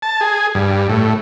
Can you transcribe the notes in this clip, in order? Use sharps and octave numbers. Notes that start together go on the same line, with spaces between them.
A5
G#4
G2
A2